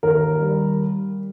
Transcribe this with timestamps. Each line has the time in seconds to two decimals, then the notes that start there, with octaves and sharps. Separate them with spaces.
0.03 D#2 A#4
0.39 G3